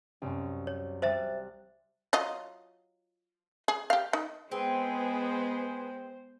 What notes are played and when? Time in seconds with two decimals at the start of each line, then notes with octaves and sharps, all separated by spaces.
0.22 C2 F#2
0.67 C#5
1.02 G3 C5 E5 F#6 A6 E7
2.13 F#3 F4 D#5
3.68 G#4
3.90 G4 F5
4.13 D#4
4.51 G#3 B3 C4 G#4 B4 C5 G#5